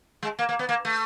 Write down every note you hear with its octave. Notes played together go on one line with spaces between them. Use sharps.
G#3
A#3
A#3
B3
A#3
A3